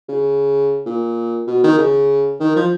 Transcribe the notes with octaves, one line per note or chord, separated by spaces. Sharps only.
C#3
A#2
B2
D#3
C#3
D#3
F3